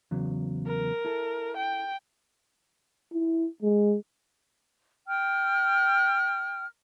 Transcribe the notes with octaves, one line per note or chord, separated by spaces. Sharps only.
E2 C#3 F#3
A#4
E4 A4
G5
E4
G#3
G5 F6